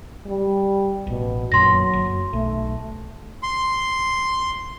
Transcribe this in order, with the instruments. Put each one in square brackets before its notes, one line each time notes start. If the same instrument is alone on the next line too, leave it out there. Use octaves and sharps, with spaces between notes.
[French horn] G3
[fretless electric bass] A1 [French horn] B2
[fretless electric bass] F#2 A#2 D#3 [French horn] F#3 [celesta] C6 A#6
[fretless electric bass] F#1
[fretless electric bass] B1 [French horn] A3
[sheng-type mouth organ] C6